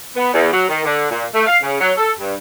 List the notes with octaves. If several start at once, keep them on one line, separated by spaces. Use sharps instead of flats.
B3
E2
F#3
D#3
D3
A#2
A3
F5
C#3
F#3
A4
G2